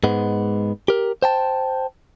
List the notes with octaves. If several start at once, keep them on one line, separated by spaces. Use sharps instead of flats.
G#2 G#3 B3
G4 A#4
C5 G5 A5